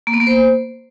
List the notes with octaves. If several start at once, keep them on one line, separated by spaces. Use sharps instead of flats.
A#3
B3
A#3
C5